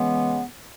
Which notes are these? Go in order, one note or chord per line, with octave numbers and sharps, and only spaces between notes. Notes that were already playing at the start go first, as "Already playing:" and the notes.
Already playing: C#3 E3 G#3 B3